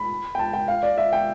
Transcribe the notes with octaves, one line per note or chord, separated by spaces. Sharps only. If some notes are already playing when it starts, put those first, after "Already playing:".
Already playing: B5
G5
A5
G5
F5
D5
E5
G5